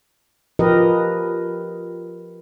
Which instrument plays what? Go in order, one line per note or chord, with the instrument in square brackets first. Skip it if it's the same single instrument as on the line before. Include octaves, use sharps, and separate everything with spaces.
[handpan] F3 G4 A#4 B4 D#5